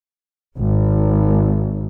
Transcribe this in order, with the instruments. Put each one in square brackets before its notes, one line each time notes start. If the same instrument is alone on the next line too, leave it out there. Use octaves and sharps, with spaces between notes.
[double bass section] G#1